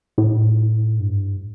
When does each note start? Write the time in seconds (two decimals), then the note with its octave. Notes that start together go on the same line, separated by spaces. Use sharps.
0.18 A2
1.00 G2